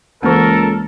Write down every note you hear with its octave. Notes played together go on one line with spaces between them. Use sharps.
C#2 E3 A#3 A4 A#4